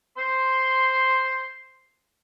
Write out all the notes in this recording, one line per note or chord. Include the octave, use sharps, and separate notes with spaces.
C5 C6